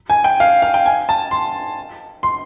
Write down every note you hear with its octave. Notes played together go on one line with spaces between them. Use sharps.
G#5
G5
F5
F5
G5
G#5
A5
C6
C6